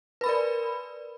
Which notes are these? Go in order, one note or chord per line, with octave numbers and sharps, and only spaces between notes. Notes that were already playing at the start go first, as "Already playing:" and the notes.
A#4 B4 D5 B5